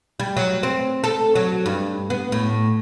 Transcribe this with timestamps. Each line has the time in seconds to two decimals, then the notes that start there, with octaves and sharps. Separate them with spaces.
0.20 G3
0.37 F#3
0.63 C4
1.04 A4
1.35 F#3
1.66 G2
2.10 B3
2.32 A2